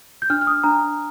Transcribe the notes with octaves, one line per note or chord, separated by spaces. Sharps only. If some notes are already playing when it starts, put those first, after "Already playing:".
G6
D4 F6
F6
D#6
D4 A#5